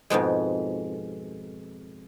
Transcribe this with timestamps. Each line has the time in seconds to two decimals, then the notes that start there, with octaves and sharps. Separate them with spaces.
0.10 F2 G#2 B2 G#3